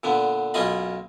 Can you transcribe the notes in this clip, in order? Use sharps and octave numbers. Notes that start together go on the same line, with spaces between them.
A#2 D3 B3
B1 A#3 C#4 F4 D#5 B5